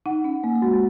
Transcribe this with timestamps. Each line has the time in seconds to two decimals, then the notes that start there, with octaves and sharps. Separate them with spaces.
0.06 D#4 F#5
0.24 C#4 F#5
0.43 A#3 F#5
0.55 A#3
0.62 G#3 F#4
0.74 G#3